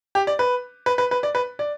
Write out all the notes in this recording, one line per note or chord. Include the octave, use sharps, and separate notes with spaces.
G4
D5
B4
B4
B4
B4
D5
B4
D5